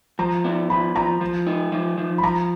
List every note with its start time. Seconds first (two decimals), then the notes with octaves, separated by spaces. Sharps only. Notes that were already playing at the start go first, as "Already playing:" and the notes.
0.19 F3 A#5
0.44 B3
0.70 F3 B5
0.95 F3 A#5
1.21 F3
1.47 D#4
1.72 F3
1.98 F3
2.18 B5
2.23 F3 A#5